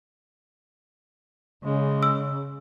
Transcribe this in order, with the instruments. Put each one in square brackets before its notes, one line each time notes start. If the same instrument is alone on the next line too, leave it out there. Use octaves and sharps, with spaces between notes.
[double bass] C#3 [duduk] G#3
[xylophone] E6